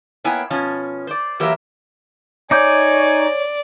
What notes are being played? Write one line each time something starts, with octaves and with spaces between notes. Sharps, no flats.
A#3 B3 E4 C#5 G5 G#5
B2 F3 C#4
C5 D5
E3 F#3 A#3 G4 A#4 E5
D#4 C#5 D5 G#5 D6 G6